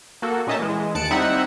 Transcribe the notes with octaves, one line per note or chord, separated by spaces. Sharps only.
A#3 F#4 A4
A#2 C#4 D#4 D#5 E5 A5
E3 G#3
D#2 A5 F#6 C#7 D7
G3 C4 D#4 E4 E5 F#5